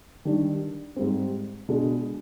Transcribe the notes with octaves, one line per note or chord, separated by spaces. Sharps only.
D#3 G3 D4
G#2 G3 C4
B2 G#3 D4